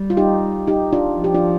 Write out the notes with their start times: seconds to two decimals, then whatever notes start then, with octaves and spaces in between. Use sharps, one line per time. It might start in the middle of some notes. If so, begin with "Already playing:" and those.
Already playing: G3
0.10 F4
0.17 D#4 G4
0.67 D#4 G4
0.93 D4 F4
1.18 F3
1.24 G4
1.34 D4 F4